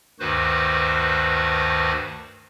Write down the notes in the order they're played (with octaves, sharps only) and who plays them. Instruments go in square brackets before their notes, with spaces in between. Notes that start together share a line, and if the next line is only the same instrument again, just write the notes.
[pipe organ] D2 G2 D#3 F#4 B4 C5